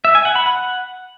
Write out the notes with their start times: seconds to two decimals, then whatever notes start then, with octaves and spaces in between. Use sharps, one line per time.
0.05 E5
0.15 G#5
0.25 F#5
0.36 B5
0.46 F#5